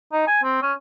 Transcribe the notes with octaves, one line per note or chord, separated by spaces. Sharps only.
D#4
G#5
C4
C#4